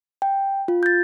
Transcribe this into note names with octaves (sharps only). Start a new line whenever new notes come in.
G5
F4
G6 A6